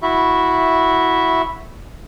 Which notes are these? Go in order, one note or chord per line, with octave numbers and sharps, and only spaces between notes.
E4 F#4 E5